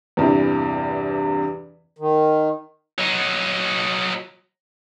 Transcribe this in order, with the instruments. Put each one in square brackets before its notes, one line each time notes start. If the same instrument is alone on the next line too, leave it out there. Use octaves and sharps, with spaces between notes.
[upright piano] E2 G2 C3 E3
[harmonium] D#3
[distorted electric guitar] F#3 D#4